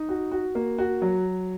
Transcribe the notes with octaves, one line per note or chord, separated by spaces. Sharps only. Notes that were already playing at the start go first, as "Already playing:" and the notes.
Already playing: D#4
F#4
F#4
A#3
F#4
F#3